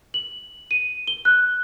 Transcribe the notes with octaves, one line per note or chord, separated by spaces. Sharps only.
F#7
D#7
G7
F#6